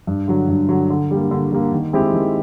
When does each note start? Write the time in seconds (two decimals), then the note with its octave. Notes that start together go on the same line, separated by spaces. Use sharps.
0.07 G2
0.28 D3 F#3
0.49 G2
0.68 D3 F#3
0.90 D3
1.11 G3 A#3
1.31 D3
1.51 G3 A#3
1.72 D#3
1.93 G#3 C4 E4 G4
2.13 D#3